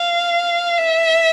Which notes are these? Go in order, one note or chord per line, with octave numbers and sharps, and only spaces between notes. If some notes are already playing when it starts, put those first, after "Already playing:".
Already playing: F5
E5